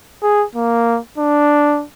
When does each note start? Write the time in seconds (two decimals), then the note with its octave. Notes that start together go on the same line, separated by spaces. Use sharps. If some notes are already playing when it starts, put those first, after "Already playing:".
0.23 G#4
0.56 A#3
1.18 D4